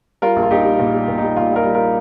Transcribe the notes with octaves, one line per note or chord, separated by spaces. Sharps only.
G3 F4 A#4
A#1
F4
A#1 D#4 G4
G3
A#2
G3
A#2
D#4
G3
A#2 F4
G3
F4 A#4
G3
F4 A#4